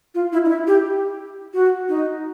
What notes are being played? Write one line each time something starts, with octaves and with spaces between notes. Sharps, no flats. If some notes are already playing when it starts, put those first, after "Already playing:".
F4
E4
D#4
E4
G4
F#4
D#4